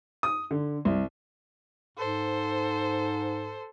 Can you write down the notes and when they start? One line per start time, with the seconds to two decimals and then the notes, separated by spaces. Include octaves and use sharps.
0.23 D#6
0.51 D3
0.85 C2
1.97 G#2 A4 C5